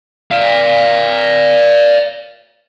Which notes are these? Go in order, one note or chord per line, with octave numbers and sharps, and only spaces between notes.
D5 F5